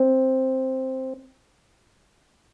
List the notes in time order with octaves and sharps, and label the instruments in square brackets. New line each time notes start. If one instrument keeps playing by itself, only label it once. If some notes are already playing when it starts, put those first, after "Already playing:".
Already playing: [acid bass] C4